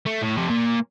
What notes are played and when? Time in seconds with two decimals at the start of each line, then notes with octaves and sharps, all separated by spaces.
0.06 A3
0.21 A2
0.36 F2 C3
0.49 A#2